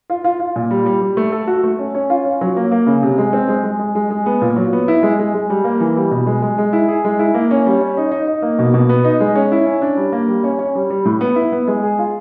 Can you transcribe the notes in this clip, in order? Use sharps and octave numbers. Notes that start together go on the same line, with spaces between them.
F4
F4
F4
A#2
G3
G3
G3
A3
A4
F#4
A3
C#4
C#4
F4
C#4
F#3
A#3
A#3
C#3
C3
G#3
C4
G#3
G#3
G#3
G#3
G#3
B3
A#2
F#3
B3
E4
G#3
G#3
G#3
G3
A#3
E3
G3
B2
G#3
G#3
G#3
E4
G#4
G#3
E4
A#3
C#4
G3
C#4
D#4
D#4
D#4
A#3
B2
B2
B3
D#4
G#3
C#4
E4
C#4
D4
G3
A#3
G3
C#4
C#4
G3
G3
A2
B3
E4
B3
G#3
G#4
F4